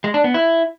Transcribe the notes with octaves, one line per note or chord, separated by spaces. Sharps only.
G#3
D4
B3
E4